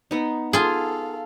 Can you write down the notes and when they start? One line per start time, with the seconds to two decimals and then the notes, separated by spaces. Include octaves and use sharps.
0.11 B3 D#4
0.53 F4 G#4 A4 F5